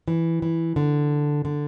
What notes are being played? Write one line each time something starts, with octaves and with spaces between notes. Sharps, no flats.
E3
E3
D3
D3